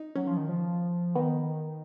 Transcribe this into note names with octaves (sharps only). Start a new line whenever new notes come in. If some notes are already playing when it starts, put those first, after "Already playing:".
Already playing: D#4
F#3 C#4
F3
D#3
F3
D#3 B3